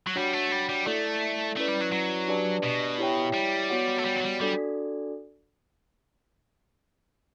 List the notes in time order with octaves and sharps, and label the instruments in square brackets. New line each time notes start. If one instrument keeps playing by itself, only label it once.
[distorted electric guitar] F#3
[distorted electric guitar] G3 [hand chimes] D4 F#4 C#5 F#5
[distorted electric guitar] A3
G3
G3
[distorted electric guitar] A3 [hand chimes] E4 A4 D5
[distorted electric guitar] A3 [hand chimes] C#4 E4 B4 D5
[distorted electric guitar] G3
F#3
F#3
[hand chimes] D4 G4 B4 D5 A5
[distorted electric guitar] B2
[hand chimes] E4 G4 C#5 E5 G5
[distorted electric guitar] G3
[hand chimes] B3 F#4 C#5 F#5
[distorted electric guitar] A3
G3
F#3
G3
[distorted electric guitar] G3 [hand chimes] D4 F#4 A4 D5